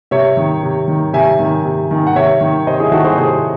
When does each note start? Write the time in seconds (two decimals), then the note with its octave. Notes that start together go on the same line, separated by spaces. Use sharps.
0.11 C3 C#5 E5
0.37 D#3
0.63 C3
0.88 D#3
1.13 C3 E5 G#5
1.39 D#3
1.65 C3
1.91 D#3
2.07 F#5
2.15 C3 C#5 E5
2.41 D#3
2.67 C3 C5 D#5
2.79 E4 G#4
2.92 D#3 F#4 A4
3.04 G#4 C5
3.18 C3 G#4 C5